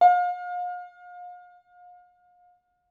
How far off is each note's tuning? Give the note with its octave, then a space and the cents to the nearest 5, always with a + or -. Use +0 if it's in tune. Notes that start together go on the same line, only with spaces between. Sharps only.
F5 +40